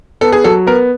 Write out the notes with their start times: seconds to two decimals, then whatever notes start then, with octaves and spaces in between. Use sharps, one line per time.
0.21 B3 A4
0.32 G#4
0.44 F#3 A4
0.67 B3 A#4